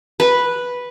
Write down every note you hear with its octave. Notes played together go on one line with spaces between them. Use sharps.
B4